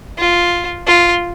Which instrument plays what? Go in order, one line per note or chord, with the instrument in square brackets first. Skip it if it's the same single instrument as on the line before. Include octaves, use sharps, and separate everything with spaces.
[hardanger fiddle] F4
F4